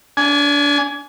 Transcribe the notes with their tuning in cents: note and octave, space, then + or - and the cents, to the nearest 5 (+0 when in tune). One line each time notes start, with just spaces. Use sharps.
D4 -30 G#5 +15